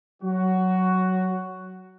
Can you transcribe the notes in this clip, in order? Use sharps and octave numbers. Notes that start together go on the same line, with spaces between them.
F#3 F#4